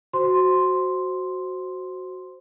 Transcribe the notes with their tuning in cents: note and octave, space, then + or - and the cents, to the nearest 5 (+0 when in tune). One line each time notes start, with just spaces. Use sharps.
F#4 +0 C5 +0 C6 +0